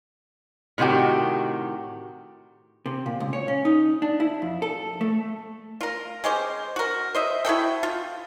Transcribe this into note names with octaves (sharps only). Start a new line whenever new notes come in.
A2 C3 D#3 F#4 G4
C3
A#2
C#2
C#5
C#4
D#4
D4
E4
F2
A4
A3
F4 A#4
G#3 C#4 G4 C5
F#4 A#4
C5 D#5 E5
E4 F#4 A4 G5
F4